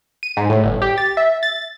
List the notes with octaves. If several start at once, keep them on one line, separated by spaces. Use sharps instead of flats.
D#7
G#2
A2
G1
G4
A6
E5
A6